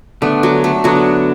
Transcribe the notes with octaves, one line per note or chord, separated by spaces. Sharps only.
D3 A3 B3 D4
F#3
A3
D3 F#3 B3 D4 F#4